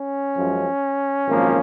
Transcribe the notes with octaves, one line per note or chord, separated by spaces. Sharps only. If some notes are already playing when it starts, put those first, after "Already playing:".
Already playing: C#4
F#2 F3 G#3
G#1 F#2 F3 A#3